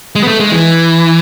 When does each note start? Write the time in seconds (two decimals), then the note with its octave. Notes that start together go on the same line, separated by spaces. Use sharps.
0.15 G#3
0.23 B3
0.28 A3
0.40 G#3
0.52 E3